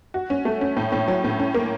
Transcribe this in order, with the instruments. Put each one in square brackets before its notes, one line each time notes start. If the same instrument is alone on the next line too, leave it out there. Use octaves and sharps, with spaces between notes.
[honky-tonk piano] F#4
C#4
A3
C#4
A2
A2
F#3
A2
C#4
A#3